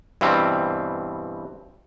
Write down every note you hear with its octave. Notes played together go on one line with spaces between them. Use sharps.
G2 B2 E3 G3 C4